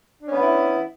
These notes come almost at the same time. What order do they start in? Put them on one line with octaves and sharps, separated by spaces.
D4 C#4 B3 E3 E4